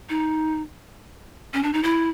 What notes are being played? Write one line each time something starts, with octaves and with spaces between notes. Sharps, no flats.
D#4
C#4
D4
D#4
E4